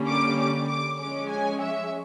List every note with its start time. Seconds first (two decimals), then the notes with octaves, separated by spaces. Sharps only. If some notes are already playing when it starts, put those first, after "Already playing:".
Already playing: D3 G3 A#3 C#4
0.08 D6
0.39 D6
0.69 D6
1.00 F3 G#3 C#4 D6
1.30 G#5
1.61 E5